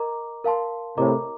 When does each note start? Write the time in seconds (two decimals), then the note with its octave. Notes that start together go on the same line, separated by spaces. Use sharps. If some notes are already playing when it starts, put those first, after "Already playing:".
Already playing: A#4 D#5 A#5 D6
0.44 A#4 F5 A5 C6
0.97 A2 C3 A#4 D#5 A#5 D6